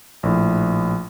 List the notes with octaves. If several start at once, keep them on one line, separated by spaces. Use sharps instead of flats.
A#1 A2